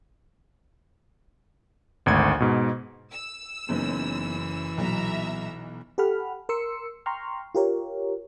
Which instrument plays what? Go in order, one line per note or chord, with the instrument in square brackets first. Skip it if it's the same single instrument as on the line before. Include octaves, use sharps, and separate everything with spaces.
[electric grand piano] G#1 D2 G#6
G#2 B2
[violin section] E6
[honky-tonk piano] F#1 F#2 [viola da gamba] E3 [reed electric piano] B3 C#4 D#4
[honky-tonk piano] B1 [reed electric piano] A#2 F#3 [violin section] E5 A#5 E6
[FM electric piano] G4 A4 F#5 B5 F6
A#4 C6 E6 C#7
G5 A#5 C6 C#6 F6
F4 G4 A#4 C#5